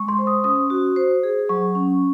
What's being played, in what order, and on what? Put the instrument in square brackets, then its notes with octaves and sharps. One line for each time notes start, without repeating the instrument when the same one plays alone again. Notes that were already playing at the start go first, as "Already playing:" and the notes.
Already playing: [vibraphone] G#3 [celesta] C#6
[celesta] C6
[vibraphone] C5
[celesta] D#6
[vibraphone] C#4 [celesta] D#6
[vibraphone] F#4
C5
G#4
[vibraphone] F#3 [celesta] C#6
[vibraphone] C#4